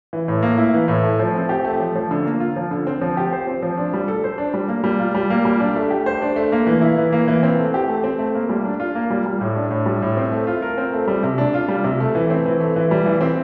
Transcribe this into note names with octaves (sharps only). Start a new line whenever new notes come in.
E3
A2
A#3
E4
E3
A2
A3
F3
C4
G4
A3
F3
F3
D3
A#3
F4
F3
D3
C4
F3
G4
C5
C4
F3
D4
G3
A4
C5
D4
G3
A#3
G3
F4
G3
A#3
G3
D4
A3
G4
C5
D4
A3
A#3
E3
E4
E3
A#3
E3
C4
A3
G4
A3
C4
A3
A#3
G3
D4
F4
A#3
G3
G3
A2
D4
A2
G3
A2
C4
A3
F4
A#4
C4
A3
G3
C3
D4
F4
G3
C3
A3
E3
C4
E3
A3
E3
G3
E3
C4